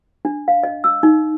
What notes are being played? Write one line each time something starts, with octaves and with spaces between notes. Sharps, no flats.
D4
F5
D#5
E6
D#4